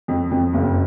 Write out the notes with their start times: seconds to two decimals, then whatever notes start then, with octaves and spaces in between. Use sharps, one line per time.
0.08 F2
0.31 F2
0.54 F#1